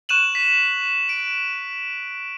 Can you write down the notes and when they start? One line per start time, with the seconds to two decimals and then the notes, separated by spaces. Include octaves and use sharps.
0.09 C#6 F#6 D#7 E7 F#7
0.35 B6
1.09 D7